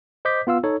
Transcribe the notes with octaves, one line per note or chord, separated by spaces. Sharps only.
C5 D#5 D6 G6 B6
B3 F4 F5 E6
D#4 A4 C#5